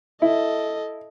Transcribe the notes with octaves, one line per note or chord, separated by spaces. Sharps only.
E4 A4 D#5